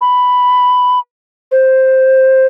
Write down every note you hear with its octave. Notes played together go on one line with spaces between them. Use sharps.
B5
C5